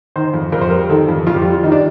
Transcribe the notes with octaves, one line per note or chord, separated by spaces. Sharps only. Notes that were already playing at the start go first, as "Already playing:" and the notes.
D#3 C5
F2
F2 A#4
C5
G3 A#4
D#3 A4
F2
F2 F4
G4
G3 F4
D#3 D#4
D4